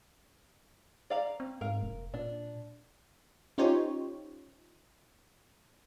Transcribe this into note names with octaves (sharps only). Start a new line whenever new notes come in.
D5 F5 A#5
C4
G#2 A#4 F5
F1
A#2 D4
C#4 D#4 F4 G4 C5 C#5